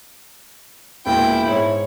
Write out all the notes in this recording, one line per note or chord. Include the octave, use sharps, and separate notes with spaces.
E1 A#2 E4 G5
G#2 C#5